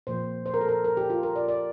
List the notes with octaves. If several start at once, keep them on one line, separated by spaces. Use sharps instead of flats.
A#2 F3 A#3 C5
C5
A#4
A4
A#4
A#4
G4
F4
A#4
D5
D5